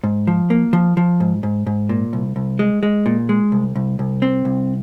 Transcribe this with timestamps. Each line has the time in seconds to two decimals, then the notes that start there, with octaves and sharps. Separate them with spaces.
0.04 G#2
0.27 F3
0.50 A#3
0.73 F3
0.97 F3
1.20 G#2
1.43 G#2
1.67 G#2
1.89 A#2
2.13 C2
2.36 C2
2.59 G#3
2.83 G#3
3.06 A#2
3.29 G#3
3.52 C2
3.76 C2
3.99 C2
4.22 C4
4.45 C2